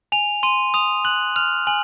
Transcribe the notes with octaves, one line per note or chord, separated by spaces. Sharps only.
G#5 F7
C6 D#7
D#6 F7
F#6 F#7
F6 F7
G#5 F#7